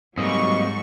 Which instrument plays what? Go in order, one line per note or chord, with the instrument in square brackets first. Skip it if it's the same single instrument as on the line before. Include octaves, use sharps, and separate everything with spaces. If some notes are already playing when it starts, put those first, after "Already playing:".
[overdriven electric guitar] G#2 [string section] F#3 C#6 [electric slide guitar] G3 A#3 C4 [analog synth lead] D#5